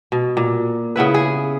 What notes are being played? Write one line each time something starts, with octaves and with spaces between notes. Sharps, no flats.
B2
A#2
C#3 B3 E4 B4
G#4